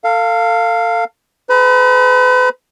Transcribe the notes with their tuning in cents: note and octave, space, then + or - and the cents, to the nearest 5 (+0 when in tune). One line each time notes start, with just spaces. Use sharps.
A4 +35 F5 +0
G#4 +45 B4 +40 B5 -45